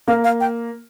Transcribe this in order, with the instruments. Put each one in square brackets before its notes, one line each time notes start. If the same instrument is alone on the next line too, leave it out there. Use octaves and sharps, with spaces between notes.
[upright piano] A#3 [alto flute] F5
[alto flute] F5
G5